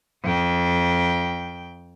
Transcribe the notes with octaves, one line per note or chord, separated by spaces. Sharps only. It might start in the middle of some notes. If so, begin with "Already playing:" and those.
F2 G5